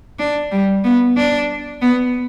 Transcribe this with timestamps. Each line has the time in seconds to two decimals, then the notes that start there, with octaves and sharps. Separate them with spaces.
0.19 D4
0.52 G3
0.84 B3
1.17 D4
1.82 B3